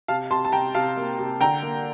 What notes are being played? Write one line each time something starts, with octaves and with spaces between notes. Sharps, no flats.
C3 F5 A5
C3 A5 C6
A5
C3 G5 A#5
C3 F5 A5
A#3
C3
D3 G5 A#5
A#3